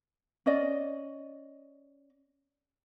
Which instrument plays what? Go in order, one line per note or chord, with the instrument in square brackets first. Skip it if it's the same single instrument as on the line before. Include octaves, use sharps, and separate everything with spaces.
[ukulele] C#4 D5 D#5